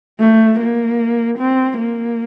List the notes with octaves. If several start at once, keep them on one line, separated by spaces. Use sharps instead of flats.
A3
A#3
C4
A#3